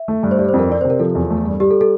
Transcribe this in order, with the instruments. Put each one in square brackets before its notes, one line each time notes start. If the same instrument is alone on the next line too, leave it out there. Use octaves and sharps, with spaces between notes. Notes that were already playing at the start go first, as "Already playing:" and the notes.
Already playing: [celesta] E5
[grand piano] A3
G2
[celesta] C5
[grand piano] G3 [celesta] D5
[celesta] C5
[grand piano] F2
[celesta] A#4
[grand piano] C4 [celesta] D5
[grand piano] C3 [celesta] C5
[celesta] A#4
[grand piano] F3 [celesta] A4
[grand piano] E2
A3
G2
[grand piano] G3 [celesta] G4
[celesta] A4
A4